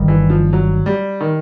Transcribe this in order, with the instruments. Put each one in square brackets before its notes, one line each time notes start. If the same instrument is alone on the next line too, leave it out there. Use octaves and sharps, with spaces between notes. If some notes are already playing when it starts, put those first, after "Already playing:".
Already playing: [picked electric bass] G1 G2 D#3 G3
[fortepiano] E3
F3
F#3
G3
D#3